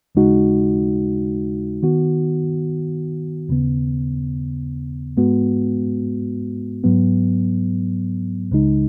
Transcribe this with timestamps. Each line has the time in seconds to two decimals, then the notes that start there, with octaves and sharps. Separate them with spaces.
0.15 D#2 C#3 G#3 D#4 F#4
1.83 D#3 B3 F#4
3.49 D#2 C#3 B3
5.17 G#2 G#3 B3 F#4
6.84 G#2 F#3 B3
8.51 C#2 C#3 G#3 D#4